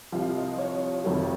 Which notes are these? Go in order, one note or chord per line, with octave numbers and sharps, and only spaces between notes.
C2 C3 F3 F5
D#5
C#5
F1 F2 C3 D#3 F#3